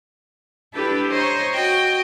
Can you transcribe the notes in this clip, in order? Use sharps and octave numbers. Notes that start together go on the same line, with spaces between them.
D4 E4 G4 A4 B4
C5 C#5 D#5 A#5
F#4 D#5 G5